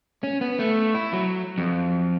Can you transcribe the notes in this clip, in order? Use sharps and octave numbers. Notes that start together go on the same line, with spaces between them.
C#4
B3
A3
E4
F#3
F2